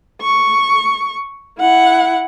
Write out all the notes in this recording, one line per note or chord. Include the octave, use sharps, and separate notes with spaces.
C#6
E4 F#5